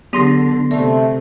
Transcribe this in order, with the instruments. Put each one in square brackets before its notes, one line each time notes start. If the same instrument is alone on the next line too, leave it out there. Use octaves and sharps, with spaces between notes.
[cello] D3 [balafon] F#3 G4 G#4 [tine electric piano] B3 C6 A#6
[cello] C3 [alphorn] A3 [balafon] D5 E5